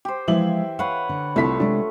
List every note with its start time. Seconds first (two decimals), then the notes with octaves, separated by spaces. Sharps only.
0.05 G4 C5
0.28 E3 F3 G#3 E5 F5 F#7
0.79 B4 C#5 F5 F#5
1.09 D3
1.36 C2 A3 E4 F4 B6
1.60 C3 G#3 D4 E5